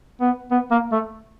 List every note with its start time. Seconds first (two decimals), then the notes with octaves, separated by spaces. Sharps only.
0.21 B3
0.51 B3
0.71 A#3
0.92 A3